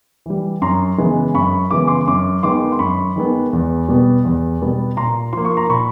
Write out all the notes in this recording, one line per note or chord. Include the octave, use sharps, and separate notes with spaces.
E3 G3
F#2 A#5 C6
C#3 E3 G#3 B3
F#2 B5 C#6
C#3 E3 G#3 B3 D6
C6 D6
F#2 C6 D6
D#3 G#3 B3 C6 D6
C6
F#2 B5 C#6
D#3 G#3 B3
E2
B2 G3 B3
E2
B2 G3 B3
A#2 A#5 C6
F3 A#3 C6
C#6
A#5 C6
A#2 B5 C#6